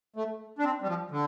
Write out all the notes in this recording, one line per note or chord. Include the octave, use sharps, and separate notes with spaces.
A3
D4
C4
G3
F3
D3